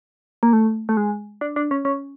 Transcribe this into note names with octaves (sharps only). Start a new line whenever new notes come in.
A#3
A3
A3
G#3
D4
D4
C#4
C#4